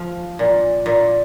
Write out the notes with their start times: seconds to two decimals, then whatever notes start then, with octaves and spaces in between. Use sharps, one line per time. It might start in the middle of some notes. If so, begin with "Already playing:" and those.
Already playing: F3
0.39 A#2
0.86 A#2